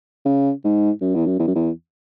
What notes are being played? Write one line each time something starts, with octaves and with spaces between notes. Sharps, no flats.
C#3
G#2
F#2
E2
F#2
E2
F#2
E2